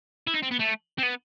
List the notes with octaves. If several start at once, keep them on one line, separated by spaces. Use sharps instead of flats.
E4
D#4
C4
B3
A3
C4
B3